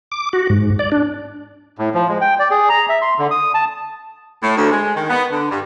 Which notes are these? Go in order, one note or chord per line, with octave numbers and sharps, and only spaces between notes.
D6
F#4
G#2
D5
D4
A2
F3
G#3
G5
D5
G#4
A#5
E5
C6
D3
D#6
A5
A2
D2
G#3
D#3
B3
D3
G2